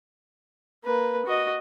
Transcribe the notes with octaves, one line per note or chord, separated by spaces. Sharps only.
A#3 B4
F#4 D#5